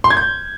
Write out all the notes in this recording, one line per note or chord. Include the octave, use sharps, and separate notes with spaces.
C6
G#6
G6